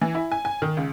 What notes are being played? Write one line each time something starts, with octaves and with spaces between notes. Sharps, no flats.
E3
E4
G#5
G#5
D#3
C#2